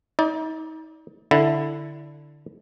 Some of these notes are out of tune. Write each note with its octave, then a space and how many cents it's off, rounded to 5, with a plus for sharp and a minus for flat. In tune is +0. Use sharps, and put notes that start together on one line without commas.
D#4 +35 D5 +0
D3 +0 E4 +0